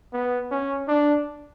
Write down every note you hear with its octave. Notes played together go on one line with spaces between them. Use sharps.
B3
C#4
D4